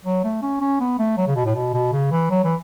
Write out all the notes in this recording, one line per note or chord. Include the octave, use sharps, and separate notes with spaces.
F#3
A3
C#4
C#4
B3
A3
F#3
C#3
B2
A2
B2
B2
C#3
E3
F#3
E3